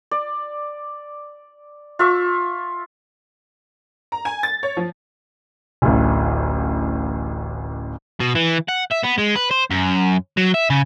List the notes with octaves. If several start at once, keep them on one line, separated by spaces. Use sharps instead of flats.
D5
F4 E5 C#6
A#5
G#5
A6
C#5
F3
D1 A1
B2
E3
F#5
E5
B3
G#3
B4
C5
F#2
F#3
E5
C#3